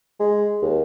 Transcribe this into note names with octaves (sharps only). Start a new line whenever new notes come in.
G#3
D#2